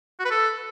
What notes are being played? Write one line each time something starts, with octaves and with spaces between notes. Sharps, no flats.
F#4
B4
A4